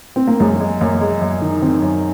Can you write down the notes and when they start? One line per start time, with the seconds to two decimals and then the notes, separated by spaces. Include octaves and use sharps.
0.16 C4
0.27 A#3
0.40 F#2 G#3
0.60 G#3
0.81 F#2 A#3
1.01 G#3
1.21 F#2
1.42 D#3
1.62 D#3 C4
1.82 F#2